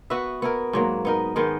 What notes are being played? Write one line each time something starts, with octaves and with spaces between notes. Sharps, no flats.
B3 F#4 B4 E5
B3 E4 A#4
G#2 F#3 A#3
B3 D#4 A#4
D#3 G#3 B3 D#4